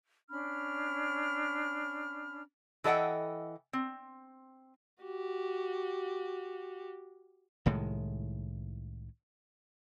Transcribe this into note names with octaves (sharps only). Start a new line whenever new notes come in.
C#4 D4 B5 F6
E3 A4 D#5 F#5 G5
C4
F#4 G4
C2 A2 D#3 G#3